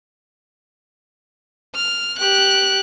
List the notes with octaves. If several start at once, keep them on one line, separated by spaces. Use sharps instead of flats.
F6
G4 F#6